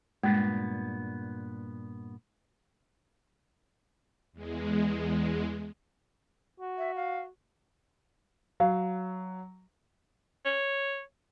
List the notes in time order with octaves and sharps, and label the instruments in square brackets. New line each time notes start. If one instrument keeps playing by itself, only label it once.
[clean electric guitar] G2 A#2 B3 [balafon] G#3
[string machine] E2 G#3
[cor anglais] F#4
[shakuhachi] E5
F5
[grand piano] F#3 [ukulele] F5
[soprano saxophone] C#5